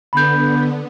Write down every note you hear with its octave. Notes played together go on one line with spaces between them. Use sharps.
D3 B3 B5 G6